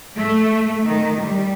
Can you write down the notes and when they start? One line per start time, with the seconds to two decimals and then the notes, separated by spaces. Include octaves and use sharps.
0.18 A3
0.83 D#3
1.19 G3